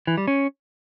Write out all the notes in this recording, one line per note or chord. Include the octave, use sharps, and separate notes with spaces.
E3
G3
C#4